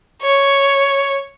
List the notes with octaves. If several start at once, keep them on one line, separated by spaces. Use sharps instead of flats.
C#5